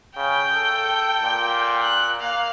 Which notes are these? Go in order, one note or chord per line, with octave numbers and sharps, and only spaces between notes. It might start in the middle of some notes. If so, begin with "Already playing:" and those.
C#3 G5
A4
A#2
F#6
A#3 F5